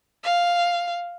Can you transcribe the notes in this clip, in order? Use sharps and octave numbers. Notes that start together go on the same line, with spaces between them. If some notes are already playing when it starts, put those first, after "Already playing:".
F5